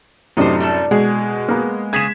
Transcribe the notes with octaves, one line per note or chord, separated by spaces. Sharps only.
F#2 A2 C3 D4 D#4 C5
G3 A3 A4
B2 G#3 G#4
A#3 B3
C#3 G#4 G#5 G#6 B6 E7